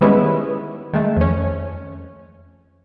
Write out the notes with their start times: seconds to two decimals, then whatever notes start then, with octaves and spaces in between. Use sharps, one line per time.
0.01 D#3 G3 G#3 B3 C#4 E4
0.93 D#3 G#3 A3
1.16 F2 C#4